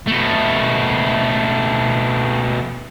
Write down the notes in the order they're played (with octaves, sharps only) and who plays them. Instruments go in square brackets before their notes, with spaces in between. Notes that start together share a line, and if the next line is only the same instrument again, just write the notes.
[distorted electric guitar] B2 A3